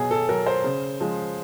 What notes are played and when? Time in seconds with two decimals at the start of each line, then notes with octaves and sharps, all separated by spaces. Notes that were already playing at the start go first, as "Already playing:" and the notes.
Already playing: B2 F#3 G#4
0.11 A4
0.29 F#3 A#4
0.46 C5
0.64 C#3
1.00 F3 G#3